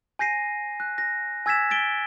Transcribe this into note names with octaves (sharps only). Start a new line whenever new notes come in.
G#5 G6 A#6 C7 D#7
F#6
A#6
G#5 E6 G#6 A6 B6 E7
A6 B6 D7 G7